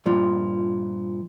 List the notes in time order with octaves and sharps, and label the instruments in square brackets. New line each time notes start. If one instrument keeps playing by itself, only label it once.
[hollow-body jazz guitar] G2 A#2 F3